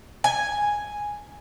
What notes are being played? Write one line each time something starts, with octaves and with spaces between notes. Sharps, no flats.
G#5